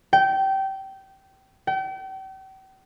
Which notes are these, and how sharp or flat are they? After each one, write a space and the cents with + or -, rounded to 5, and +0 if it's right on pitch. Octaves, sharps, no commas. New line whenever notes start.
G5 -20
G5 -40